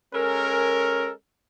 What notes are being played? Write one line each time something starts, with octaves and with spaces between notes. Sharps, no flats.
G#3 C#4 A4 A#4